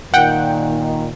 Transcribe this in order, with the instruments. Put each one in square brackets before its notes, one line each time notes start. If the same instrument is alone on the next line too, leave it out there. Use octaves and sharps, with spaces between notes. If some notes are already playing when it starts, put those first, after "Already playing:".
[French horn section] A#2 D#3 [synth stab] F#5 G5